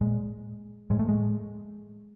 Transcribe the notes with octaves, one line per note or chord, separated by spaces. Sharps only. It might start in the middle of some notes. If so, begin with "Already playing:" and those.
A#2 G#3
A2 G#3
A3
G#3